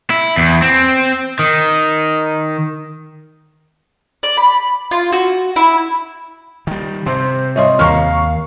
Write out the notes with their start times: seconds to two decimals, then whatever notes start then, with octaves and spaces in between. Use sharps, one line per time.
0.10 E4
0.37 E2
0.62 C4
1.39 D#3
4.23 D5
4.37 B5
4.91 F4
5.12 F#4
5.56 E4
6.67 D#3 G3
7.06 C3 C5 C6
7.56 G3 C#5 D#5 C6
7.79 D#2 F5 A#5 C#6 F6